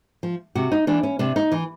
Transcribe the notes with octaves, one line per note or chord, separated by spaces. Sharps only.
F3
C3 F#4
D#4
E3 D4
C#4
C3 D4
D#4
E3